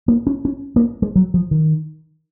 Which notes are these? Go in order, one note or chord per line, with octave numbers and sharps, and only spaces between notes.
A#3
C#4
C#4
A#3
G#3
F#3
F3
D#3